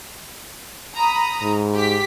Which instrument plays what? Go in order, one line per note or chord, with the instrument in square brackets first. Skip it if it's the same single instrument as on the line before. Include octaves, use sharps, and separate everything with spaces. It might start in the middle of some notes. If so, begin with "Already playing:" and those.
[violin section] A#5 B5 D#6
[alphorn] G#2
[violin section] G4 B6